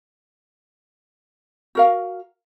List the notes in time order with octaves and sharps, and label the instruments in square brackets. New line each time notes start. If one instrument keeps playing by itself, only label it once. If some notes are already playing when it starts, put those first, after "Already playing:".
[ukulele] F#4 A#4 F5